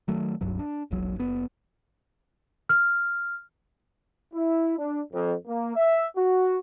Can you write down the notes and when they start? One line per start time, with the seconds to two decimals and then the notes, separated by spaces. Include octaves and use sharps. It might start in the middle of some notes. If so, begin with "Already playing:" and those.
0.08 D#3 F#3 A3
0.41 D#1 C2 G2 F#3
0.59 D4
0.91 E1 A#1 F#3
1.16 F#1 B3
2.69 F6
4.34 E4
4.78 D4
5.13 F2
5.46 A#3
5.77 E5
6.17 F#4